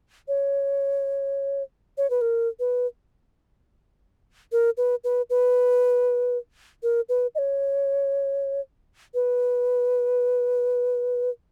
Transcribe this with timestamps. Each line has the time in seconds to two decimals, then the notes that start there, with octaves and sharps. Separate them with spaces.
0.28 C#5
1.98 C#5
2.10 B4
2.21 A#4
2.60 B4
4.52 A#4
4.77 B4
5.04 B4
5.30 B4
6.83 A#4
7.09 B4
7.35 D#5
7.38 C#5
9.14 B4